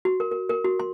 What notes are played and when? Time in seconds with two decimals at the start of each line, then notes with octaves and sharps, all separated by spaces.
0.05 F#4
0.20 A#4
0.31 A#4
0.49 A#4
0.65 F#4
0.80 C6